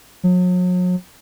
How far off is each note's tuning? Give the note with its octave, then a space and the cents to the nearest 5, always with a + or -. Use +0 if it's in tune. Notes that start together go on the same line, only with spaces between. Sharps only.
F#3 -40